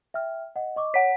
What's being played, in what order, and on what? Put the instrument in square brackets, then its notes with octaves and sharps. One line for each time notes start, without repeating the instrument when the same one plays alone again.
[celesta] E5 G5 F6
D#5 F#5
D#5 C#6 D6
[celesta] C#5 [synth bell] F#5 B6